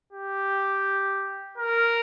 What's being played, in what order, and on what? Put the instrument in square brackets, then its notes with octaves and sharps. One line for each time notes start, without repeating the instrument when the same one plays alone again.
[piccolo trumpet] G4
A#4